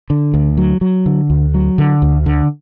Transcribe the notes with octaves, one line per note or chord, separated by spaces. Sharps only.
D3
D2
F#3
F#3
D3
D2
F#3
D3
D2
D3